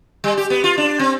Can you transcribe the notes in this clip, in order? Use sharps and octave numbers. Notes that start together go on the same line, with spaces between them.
G3
G4
B3
F4
D4
C4